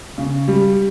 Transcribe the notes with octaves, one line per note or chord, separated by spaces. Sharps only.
C#3
G3